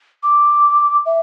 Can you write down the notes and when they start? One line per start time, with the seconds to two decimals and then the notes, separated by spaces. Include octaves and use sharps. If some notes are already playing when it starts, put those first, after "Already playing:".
0.23 D6
1.06 E5